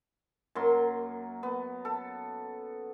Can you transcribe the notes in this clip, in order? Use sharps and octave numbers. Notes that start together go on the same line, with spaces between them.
F#2 F#3 A#3 C6
B3
A4